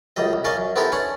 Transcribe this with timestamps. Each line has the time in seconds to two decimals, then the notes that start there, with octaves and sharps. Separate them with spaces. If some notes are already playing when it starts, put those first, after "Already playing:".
0.16 C#2 F#2 G3 D#5
0.33 C2
0.44 C#4 A#4 D5 D#5 F5
0.57 F#2
0.76 B3 C4 E4 G4 A4 A#4
0.92 C#4 D4 C#5 F#5